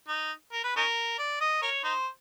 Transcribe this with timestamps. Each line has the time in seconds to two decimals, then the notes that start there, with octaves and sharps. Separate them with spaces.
0.08 D#4
0.53 A#4
0.64 B4
0.76 C#4 D#4 A#4
1.18 D5
1.41 D#5
1.62 A#4 C#5
1.84 D#4 C5